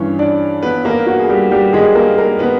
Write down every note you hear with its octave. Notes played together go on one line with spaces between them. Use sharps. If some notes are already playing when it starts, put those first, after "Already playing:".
Already playing: G2 E3 C#4 C#5
D4 D5
B3 B4
A#3 A#4
F#4
G#4
G3 G4
G3 G4
G#3 G#4
A#3 A#4
A#3 A#4
B3 B4